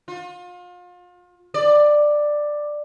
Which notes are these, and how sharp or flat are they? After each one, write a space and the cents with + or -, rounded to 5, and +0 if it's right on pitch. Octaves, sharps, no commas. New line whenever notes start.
F4 +35
D5 +10